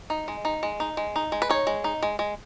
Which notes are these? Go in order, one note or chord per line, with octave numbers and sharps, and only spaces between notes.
D#4
G#3
D#4
G#3
D#4
G#3
D#4
G#3
B4
D#4 C#5
G#3
D#4
G#3
G#3